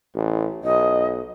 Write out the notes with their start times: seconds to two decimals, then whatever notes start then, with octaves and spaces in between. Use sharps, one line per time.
0.15 A1
0.64 B1 D#5